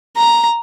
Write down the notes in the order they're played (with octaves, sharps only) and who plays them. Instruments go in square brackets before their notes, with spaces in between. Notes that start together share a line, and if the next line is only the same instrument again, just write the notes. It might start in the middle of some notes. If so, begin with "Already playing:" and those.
[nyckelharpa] A#5